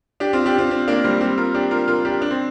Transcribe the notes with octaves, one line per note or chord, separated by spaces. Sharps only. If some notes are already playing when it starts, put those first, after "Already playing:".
D4 G4
C4 F4
D4 G4
C4 F4
C4 F4
A#3 D4
G3 C4
G3 C4
F4 A#4
D4 G4
F4 A#4
F4 A#4
D4 G4
D4
C4